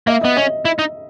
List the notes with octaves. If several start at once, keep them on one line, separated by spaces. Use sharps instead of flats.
A#3 E5
B3 D#5
C#4 D#5
E4
D#4